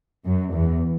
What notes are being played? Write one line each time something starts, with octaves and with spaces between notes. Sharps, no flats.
F#2
E2